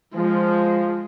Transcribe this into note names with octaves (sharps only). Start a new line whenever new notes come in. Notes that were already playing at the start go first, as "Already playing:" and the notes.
F3 G#3